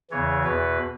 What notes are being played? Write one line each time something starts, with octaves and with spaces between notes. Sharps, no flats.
E2 C#3 E3 C#5
E2 B2 B4